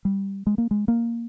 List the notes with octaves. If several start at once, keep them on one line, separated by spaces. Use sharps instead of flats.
G3
G#3
A#3
G#3
A#3